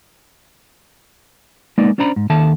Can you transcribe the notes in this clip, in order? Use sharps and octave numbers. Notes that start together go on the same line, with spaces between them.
G#3 A#3 B3 D#4 D5
C#4 D4 C5 D5 A#5 B5
G#2
D#2 D#3 A4 E5 A5